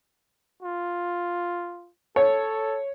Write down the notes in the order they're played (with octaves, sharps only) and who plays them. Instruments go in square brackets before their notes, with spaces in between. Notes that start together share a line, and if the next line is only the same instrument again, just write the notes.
[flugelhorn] F4
[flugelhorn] A4 [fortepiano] C#5